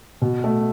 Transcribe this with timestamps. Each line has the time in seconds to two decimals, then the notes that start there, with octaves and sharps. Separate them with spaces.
0.22 B2
0.44 A3